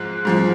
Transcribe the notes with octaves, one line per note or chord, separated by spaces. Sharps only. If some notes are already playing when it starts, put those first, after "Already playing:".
Already playing: G#2 F3 G#3 F#6
G#2 F3 G#3